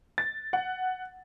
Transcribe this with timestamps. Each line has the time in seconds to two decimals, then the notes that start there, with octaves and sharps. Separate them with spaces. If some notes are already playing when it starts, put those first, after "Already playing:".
0.18 A6
0.53 F#5